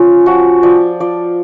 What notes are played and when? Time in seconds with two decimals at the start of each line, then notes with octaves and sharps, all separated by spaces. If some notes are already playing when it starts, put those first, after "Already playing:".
Already playing: F3 C#4 F4
0.26 F3 F#4
0.63 F3 D5
1.00 F3 D5